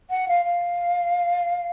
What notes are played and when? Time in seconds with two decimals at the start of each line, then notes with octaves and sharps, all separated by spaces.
0.10 F#5
0.28 F5
0.45 F5